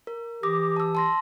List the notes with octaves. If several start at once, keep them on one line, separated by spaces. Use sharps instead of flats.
A#4
E3 G4 D6 D#6 A#6
A5 E6
A5 C6 A#6